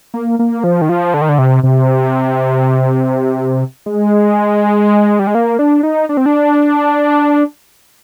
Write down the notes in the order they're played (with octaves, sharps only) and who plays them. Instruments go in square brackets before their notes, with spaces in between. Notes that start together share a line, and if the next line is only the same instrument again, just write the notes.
[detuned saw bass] A#3
A#3
F3
D#3
F3
D3
D#3
D3
C3
C3
G#3
G3
G#3
A#3
D4
D#4
D4
C4
D4